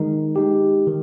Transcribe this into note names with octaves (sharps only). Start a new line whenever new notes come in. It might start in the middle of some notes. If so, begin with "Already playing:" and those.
Already playing: D#3 G#3 D#4
G#3 D#4 G4
D#3